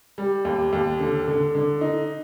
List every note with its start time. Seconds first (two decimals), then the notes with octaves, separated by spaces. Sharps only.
0.18 G3
0.45 D#2
0.73 D#2
1.00 D3
1.27 D3
1.55 D3
1.81 D#4